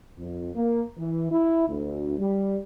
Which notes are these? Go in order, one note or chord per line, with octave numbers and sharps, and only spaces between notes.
F2
A#3
E3
E4
D2
G3